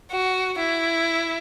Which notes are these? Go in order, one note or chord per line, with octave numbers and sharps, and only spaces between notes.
F#4
E4